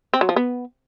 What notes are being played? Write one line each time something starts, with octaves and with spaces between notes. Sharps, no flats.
C4
F#3
F3
B3